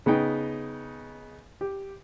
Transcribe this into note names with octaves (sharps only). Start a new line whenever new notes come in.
C#3 B3 D#4 G5
G4